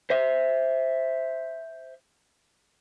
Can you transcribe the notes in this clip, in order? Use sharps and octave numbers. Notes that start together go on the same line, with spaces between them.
C5 E5